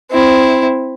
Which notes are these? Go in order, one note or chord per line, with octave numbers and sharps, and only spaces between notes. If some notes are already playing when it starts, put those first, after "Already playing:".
C4 E4